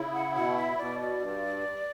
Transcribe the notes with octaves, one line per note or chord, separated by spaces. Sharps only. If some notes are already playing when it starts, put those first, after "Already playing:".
Already playing: C#3 E4
F#5
B2 F#5
E5
B2 D5
D5
G2